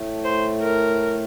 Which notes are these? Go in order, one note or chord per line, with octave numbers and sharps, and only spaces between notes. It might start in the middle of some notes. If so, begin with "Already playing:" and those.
Already playing: A2 A3
C5
A#4